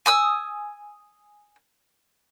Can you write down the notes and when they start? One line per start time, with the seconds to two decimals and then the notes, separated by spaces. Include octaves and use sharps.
0.06 G#5 D#6 E6